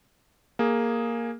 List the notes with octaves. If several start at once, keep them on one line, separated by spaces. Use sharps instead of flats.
A#3 G#4